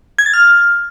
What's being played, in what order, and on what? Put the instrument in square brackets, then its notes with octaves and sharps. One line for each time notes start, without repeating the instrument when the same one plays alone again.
[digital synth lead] G#6
A6
F6